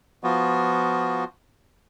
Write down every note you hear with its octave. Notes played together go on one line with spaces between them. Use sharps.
F3 B3 F4 F#4